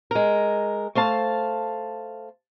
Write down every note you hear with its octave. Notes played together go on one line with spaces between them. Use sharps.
G#3 A#4
A3 C5 F5 A5